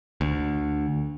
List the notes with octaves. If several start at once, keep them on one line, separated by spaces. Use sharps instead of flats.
D2